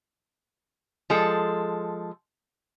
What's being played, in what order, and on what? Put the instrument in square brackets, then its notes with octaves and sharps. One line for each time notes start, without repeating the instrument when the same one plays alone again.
[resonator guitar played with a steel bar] F3 G#3 A4